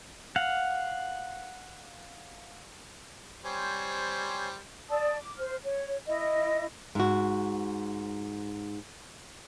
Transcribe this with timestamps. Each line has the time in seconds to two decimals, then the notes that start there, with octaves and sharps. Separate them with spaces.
0.36 F5 F#5
3.45 G3 C4 C5 C#5 G#5
4.89 D5 A5 D#6 E6
5.16 D6
5.38 C5 F6
5.64 C#5
6.06 E4 D#5
6.95 G#2 F#4